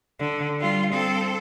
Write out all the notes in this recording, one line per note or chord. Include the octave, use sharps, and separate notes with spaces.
D3
G3 F4
C4 A4